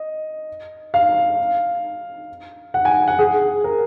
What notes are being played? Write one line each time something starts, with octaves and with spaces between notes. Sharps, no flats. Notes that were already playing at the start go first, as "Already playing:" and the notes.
Already playing: D#5
F5
F#5
G#5
F#5
G#4
A#4